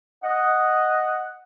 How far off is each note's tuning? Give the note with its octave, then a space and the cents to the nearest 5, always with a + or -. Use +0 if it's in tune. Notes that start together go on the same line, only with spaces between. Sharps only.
D#5 +0 F#5 +0